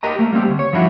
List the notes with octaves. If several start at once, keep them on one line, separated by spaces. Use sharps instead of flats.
G4 A#4 D#5 A#5
A3 A#3
G3 A#3 C4 G4
D2
C#5
G2 F3 G3 D4 E4 F#4